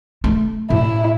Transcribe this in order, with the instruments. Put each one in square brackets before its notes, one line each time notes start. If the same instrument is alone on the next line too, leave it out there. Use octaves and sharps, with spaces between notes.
[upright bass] A3
[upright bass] A2 [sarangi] E4